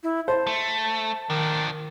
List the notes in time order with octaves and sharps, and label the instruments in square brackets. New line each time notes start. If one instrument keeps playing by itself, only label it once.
[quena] E4
[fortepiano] C5 [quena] A5
[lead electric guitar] A3
[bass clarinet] D#3 [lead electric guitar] F3 D4